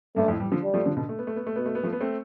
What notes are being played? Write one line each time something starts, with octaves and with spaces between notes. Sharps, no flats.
G2 A3
F2 A2
E3 G3
D3 F3
G3
F3 A3
D3 F3
B2 D3
A3
B3
A3
B3
A3
B2 B3
A3
B3
F3 A3
B3
A3 C4